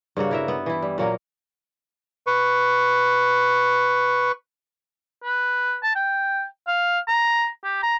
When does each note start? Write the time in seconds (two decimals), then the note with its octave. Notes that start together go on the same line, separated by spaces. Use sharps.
0.17 G2 C#3 A#3 F#4
0.31 E4 A#4 E5
0.48 B3
0.66 E3 E4
0.82 G3
0.98 A#2 F#3 A#3 A#4
2.27 B4 C#6
5.24 B4
5.83 A5
5.95 G5
6.68 F5
7.08 A#5
7.64 G4
7.83 A#5